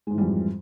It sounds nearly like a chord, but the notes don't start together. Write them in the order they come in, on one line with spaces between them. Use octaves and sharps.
G#3 G#2 E3 G3 F2